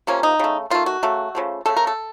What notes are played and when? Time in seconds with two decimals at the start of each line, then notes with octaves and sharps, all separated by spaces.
0.07 C3 F3 A#3 C#4
0.23 D#4
0.39 C#3 A3
0.70 D#3 A3 F4
0.86 F#4
1.03 C#3 F#3 A3
1.35 C#3 F3 A3
1.66 C#3 A3 A4
1.77 A#4
1.87 A4